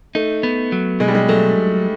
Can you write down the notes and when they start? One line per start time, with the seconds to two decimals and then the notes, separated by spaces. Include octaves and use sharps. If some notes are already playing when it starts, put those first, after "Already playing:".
0.15 A3 D#4
0.43 B3
0.72 F#3
1.00 B2 G#3
1.08 G3
1.15 G#3
1.29 F#3 A3